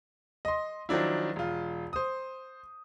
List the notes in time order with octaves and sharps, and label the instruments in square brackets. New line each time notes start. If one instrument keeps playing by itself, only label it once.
[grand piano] D#5 C6
D#3 F3 F#3 D4 E4
E1 F4
C5 D#6